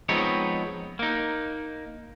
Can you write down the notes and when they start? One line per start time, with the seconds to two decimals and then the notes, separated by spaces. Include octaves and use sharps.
0.09 F3 G#3 B3 C4 D#4 C#5
0.99 A#3 D#4